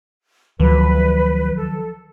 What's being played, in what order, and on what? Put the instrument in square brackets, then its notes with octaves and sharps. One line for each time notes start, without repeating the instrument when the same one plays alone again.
[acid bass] D2 [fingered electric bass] D#3 F3 F#3 [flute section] B4
[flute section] A4